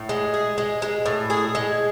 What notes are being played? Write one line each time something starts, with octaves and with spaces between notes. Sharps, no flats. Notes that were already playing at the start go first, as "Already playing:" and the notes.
Already playing: A2
G#3
G#4
G#3
G#3
A2
G#4
G#3